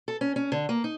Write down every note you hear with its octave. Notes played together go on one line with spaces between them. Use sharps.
A4
C#4
C#4
D3
A#3
D#4